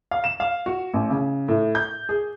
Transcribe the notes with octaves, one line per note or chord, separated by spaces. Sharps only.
F5
E7
F5
F#4
A1
C#3
A2
G6
G#4